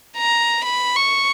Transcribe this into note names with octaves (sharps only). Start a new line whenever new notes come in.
A#5
B5
C#6